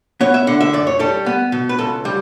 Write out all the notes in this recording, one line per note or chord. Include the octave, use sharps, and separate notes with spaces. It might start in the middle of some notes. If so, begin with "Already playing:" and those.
B3 C#5
E5
D3 F#5
E5
F#2 D5
C#5
G3 A4
B3
B2
B4
C#2 A4
G3